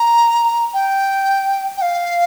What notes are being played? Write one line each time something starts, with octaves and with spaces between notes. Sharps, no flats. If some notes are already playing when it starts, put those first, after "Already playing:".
Already playing: A#5
G5
G5
F5